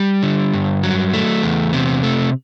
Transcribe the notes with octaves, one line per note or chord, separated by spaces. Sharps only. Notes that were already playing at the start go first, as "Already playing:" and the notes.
Already playing: G3
D3
G2
F#3
A3
E2
C3
A3